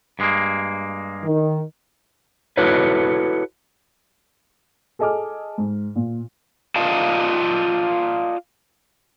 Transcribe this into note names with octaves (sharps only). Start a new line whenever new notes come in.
G2 G#3 A#3
D#3
E4 F#4 A4 B4 C#5
G#4 A4 D#5 G#5 D6 F6
G#2
A#2
F4 D5 D#5 F5 A5